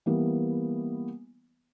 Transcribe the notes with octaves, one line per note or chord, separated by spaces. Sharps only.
E3 G3 A#3 B3